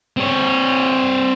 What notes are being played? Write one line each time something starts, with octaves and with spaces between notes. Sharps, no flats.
C4 C#5